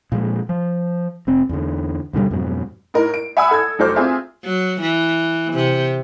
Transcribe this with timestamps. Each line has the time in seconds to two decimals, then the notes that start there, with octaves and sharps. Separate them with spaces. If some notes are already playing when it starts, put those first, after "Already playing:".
0.12 A#2 F3 G#3
0.49 F3
1.27 F1 C4
1.49 E2 D3
2.13 D#2 B2 D3 G3
2.31 F2 G#2 B2 F#3
2.94 A2 D#4 A#4
3.14 D7
3.37 E5 F#5 G#5 B5 D#6 E6
3.51 A4 E6 G#6
3.79 F1 F#3 A4 C5 D6 F6
3.96 C4 F4 G#4 E5
4.44 F#3
4.81 E3
5.53 C3